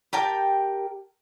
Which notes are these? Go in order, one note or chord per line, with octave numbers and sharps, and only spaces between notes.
G4 A#4 G5 A5